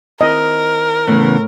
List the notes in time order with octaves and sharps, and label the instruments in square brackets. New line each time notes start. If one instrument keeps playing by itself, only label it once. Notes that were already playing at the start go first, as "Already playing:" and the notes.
[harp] D#3 C4 E4 [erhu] A#4 [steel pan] D#5
[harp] A2 [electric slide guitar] C#3 E3 B3